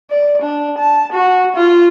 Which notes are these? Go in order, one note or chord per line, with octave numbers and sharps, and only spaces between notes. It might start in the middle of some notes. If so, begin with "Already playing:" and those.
D5
D4
A5
F#4
F4